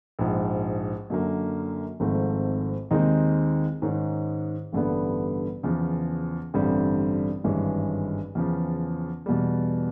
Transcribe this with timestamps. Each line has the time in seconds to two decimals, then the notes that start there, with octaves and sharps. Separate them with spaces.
0.19 A#1 G#2 F3
1.10 F#2 D3 F#3 A#3
2.00 G#1 G#2 F3 A3 C4
2.91 D#2 D#3 G#3 C4 D#4
3.82 G#2 D#3 G#3 C#4
4.72 A1 G2 D3 G3 B3
5.63 E2 C#3 F3
6.54 A1 G2 D3 G3 C4
7.44 G#1 G2 E3 G#3 C#4
8.35 E2 C#3 F3
9.26 E2 B2 G3